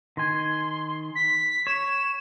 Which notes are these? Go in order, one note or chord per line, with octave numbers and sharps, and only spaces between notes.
D#3 G#5 C6
B6
C#5 E7